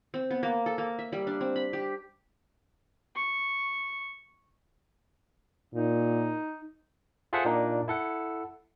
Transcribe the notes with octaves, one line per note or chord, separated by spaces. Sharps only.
C4
B3
A#3
A4
A#3
E5
G3
D4
C4
B5
G4
C#6
A#2 D#4
F4 G#4 A4 C5 E5 F#5
A#2 A#3 D4 D#4
E4 A4 F#5